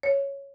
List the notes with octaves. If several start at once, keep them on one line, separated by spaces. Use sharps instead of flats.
C#5